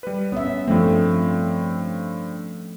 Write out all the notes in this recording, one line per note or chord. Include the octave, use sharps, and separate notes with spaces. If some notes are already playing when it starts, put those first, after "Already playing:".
G3 B4
B3 C#4 E5
G2 F3 A3 C4